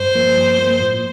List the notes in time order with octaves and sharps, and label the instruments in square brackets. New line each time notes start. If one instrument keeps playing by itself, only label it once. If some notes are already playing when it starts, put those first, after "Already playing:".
Already playing: [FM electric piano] G2 [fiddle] C5
[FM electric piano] F3 A#3
G2
F3 A#3
A2